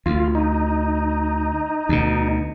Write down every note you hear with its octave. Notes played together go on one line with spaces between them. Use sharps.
D2 F4
D#4
D2 B2